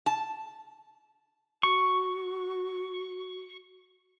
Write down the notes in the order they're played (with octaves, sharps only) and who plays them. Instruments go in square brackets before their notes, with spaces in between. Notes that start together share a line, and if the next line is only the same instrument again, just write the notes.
[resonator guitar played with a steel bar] A5
[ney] F#4 [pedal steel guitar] C#6